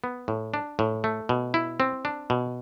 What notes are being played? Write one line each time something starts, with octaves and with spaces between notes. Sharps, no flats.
B3
A2
D4
A2
A3
B2
E4
C4
D4
B2